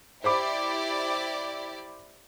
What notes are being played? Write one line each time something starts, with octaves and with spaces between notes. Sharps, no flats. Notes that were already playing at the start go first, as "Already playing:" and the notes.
E4 G4 C5 D5 B5 D6